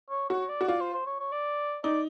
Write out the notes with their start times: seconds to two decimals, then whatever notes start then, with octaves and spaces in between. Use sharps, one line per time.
0.10 C#5
0.29 F#4 C#5
0.49 D5
0.61 F#4
0.68 F4 D5
0.81 C5
0.94 C5
1.06 C#5
1.20 C#5
1.32 D5
1.84 D#4 D5